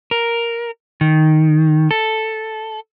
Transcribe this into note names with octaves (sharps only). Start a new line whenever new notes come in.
A#4
D#3
A4